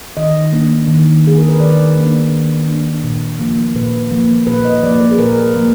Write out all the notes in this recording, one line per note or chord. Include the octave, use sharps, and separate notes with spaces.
D#3 D#5
A#3 D4
D#3
A#3 D4 G#4
A#4
B4
D#3 D5
A#3 D4
D#3
A#3 D4
A#2
F3 A#3
A#2 B4
F3 A#3
A#2 B4
D#5
F3 A#3 D5
B4
G#4
A#2 A#4
F3 A#3